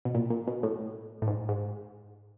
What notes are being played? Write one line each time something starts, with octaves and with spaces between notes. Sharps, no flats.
B2
A#2
A#2
B2
A2
A2
G#2
G#2